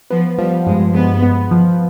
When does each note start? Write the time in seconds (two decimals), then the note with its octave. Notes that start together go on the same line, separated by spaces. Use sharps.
0.10 F3 B3
0.38 F3 G3
0.67 G2 G#3
0.95 G#3 B3
1.22 B3
1.51 F3